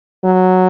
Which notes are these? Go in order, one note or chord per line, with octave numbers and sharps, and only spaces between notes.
F#3